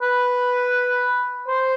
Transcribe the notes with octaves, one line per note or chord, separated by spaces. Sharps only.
B4
C5